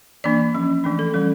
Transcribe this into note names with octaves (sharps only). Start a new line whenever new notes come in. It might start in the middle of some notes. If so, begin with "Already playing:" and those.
E3 A#3 D4 D5
F3 C#4
E3 A3 D4
A4
E3 G3 C#4